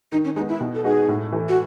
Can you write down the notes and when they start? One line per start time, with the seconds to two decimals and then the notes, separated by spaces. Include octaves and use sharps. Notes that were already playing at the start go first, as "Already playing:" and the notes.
0.12 D#3 D#4
0.25 C#4
0.36 G#3 D#4
0.40 B3
0.49 E4
0.61 B2
0.75 A4
0.84 G#3 B3 D#4 F#4 G#4
1.08 A2
1.32 E3 A3
1.49 F#4